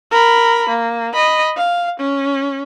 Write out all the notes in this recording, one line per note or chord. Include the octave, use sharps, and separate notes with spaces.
A#4 B5
A#3
D#5 B5
F5
C#4